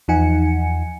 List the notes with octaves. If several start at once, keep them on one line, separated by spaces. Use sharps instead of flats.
E2 F3 D#4 F#5 G#5 C#7